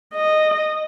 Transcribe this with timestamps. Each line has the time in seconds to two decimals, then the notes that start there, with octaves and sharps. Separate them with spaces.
0.15 D#5